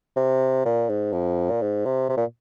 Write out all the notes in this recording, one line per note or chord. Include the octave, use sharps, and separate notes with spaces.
C3
A#2
G#2
F2
A#2
G#2
C3
C3
A#2